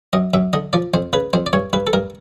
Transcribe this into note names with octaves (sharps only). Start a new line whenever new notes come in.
F#2 D#5
F#2 E5
D3 D#5
F3 D5
F2 C5
C#3 B4
F2 C5
D5
G2 C#5
G2 B4
A4
G2 A#4